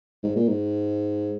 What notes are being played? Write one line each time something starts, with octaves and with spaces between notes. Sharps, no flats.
G#2
A#2
G#2